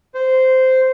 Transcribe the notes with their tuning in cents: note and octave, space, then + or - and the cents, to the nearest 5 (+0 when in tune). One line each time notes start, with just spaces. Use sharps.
C5 -10